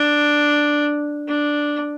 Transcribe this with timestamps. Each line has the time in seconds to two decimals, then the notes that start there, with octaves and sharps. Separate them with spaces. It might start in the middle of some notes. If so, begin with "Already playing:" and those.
Already playing: D4
1.28 D4